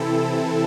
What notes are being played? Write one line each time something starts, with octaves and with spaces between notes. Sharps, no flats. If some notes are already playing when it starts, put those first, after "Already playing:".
Already playing: C3 E3 C4 E4 A4